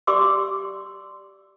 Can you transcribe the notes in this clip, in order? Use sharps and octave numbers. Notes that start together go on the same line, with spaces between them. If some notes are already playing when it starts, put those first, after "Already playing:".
G4 D5 C6 D6 E6